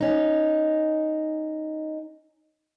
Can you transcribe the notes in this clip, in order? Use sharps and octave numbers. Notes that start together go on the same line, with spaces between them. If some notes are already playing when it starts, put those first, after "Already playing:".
C#4 D#4